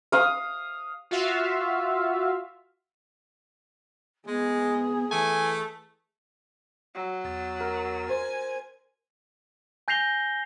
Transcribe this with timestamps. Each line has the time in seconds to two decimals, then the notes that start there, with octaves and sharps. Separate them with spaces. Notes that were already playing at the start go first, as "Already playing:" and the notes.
0.12 F5 D#6
1.11 F4 F#4 E5 F5
4.27 G#3 B3 G#4
5.11 E3 A3 G#5
6.95 F#3
7.24 E2 A6
7.60 A#4
8.09 C5 G#5
9.88 G#5 G6 A#6 C7 F7 G7